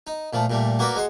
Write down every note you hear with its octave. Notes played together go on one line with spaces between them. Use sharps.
D#4
A#2 F3 A3
A#2 G3 A3
A#3 F#4 A#4 B4 D5
G#3 F#5 C6